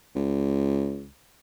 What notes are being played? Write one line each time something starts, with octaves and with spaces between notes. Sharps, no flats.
C#2